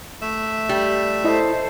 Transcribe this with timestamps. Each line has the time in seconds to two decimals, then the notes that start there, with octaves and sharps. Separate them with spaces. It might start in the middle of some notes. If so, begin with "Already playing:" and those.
0.22 A3 E5
0.69 G3
1.25 E4 A4 C5 D#5